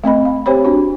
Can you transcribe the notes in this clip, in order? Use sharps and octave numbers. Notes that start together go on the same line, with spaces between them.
A3 C4 D#5 B5
F5
C4 G4 C5 C#5 B5
D4 F#4